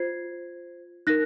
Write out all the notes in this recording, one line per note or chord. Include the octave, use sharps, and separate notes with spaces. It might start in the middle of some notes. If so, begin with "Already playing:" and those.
Already playing: F4 C5 G#6 C7
D#4 A#4 F#6 A#6